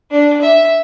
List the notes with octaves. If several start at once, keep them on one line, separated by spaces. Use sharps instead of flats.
D4
E5